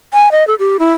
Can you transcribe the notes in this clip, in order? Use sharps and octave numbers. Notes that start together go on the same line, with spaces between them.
G#5
D#5
A4
G4
E4